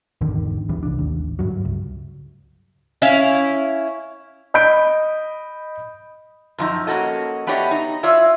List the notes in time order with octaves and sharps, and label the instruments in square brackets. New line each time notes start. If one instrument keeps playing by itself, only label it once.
[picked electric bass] G#1 E2 D3 D#3
D1 G2 E3
C2 D4
A1 D#2
D1 C2 G2 F#3
C#2
[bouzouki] C#4 E4 F5
[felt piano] D#5 B5 G6 D7
[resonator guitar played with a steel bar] F#2 F3 D#4
A#3 C#4 F#4 A4 D#5
A3 B3 D4 G4 C#5 D#5
D#4
F4 C#5 D5 E5